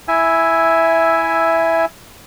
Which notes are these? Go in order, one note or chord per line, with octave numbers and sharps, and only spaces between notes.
E4 E5 G#5